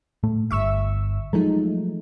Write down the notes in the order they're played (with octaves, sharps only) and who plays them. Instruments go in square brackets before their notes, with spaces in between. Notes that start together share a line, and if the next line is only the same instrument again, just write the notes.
[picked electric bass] A2 A3
[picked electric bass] G1 [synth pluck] E5 C#6 E6
[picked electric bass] F3 F#3 [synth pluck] G#3 A3 D#4